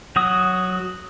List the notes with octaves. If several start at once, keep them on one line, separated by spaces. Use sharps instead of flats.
F#3 F#4 D#6